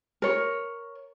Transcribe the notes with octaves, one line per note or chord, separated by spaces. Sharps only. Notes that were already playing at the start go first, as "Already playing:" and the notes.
A#4 C#5